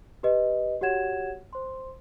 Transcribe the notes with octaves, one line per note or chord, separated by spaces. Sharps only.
G4 B4 D#5
F#4 G4 C#5 F#5 G#6 E7
C5 C6